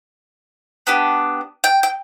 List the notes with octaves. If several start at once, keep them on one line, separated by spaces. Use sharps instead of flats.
B3 D4 G4
G5
G5